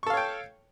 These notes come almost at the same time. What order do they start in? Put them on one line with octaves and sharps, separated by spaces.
C#6 A4 F5 C#5 G5